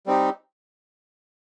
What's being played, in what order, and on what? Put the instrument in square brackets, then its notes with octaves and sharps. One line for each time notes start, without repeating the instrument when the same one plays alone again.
[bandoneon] G3 C4 D#4 G4